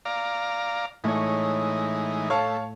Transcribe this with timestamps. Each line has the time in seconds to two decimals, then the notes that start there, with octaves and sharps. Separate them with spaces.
0.05 D5 F5 A#5
1.04 A2 E3 G#3 D#4 C#5
2.30 A3 C#5 F5 A5